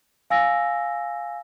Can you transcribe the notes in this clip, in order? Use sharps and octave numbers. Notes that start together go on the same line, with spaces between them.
F5 G#5 E6 A#6